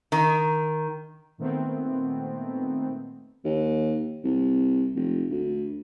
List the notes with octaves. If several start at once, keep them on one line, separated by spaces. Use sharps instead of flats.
D#3
A#2 D#3 A3 B3 C4
D#2
C2
F1
D2